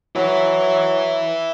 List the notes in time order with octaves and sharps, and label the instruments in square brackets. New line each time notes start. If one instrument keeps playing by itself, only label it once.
[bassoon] F#3 [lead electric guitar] E4 B4